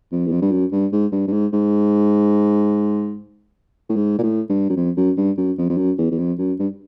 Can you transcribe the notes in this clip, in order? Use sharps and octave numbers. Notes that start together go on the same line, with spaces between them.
F2
E2
F2
G2
F#2
G2
G#2
G2
G2
G#2
G#2
A2
G#2
A#2
A2
G2
F#2
F2
F#2
G2
F#2
F2
F2
F#2
E2
E2
F2
F#2
G2